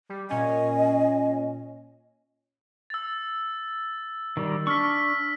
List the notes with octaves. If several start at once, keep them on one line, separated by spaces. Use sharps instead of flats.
G3
A#2 C#4 D#5 G#5
E6 A6
D#3 G3
D4 C#6 E6 F6 B6